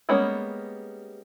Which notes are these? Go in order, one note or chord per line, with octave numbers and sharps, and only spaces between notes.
G3 G#3 A#3 B3 C#4